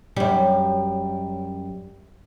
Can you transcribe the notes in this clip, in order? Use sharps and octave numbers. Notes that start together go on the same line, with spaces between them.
F#2 G3